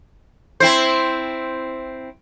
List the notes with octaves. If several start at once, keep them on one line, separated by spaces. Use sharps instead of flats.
C4 E4 C5